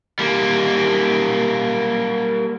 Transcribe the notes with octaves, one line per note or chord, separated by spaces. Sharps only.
G3 A#3